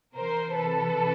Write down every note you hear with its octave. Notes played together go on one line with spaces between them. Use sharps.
C3 E3 A#4 C5
A4 B4